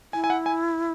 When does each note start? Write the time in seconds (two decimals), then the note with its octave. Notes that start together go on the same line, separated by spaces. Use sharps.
0.13 E4 G#5
0.24 G#5
0.30 F#5
0.46 G#5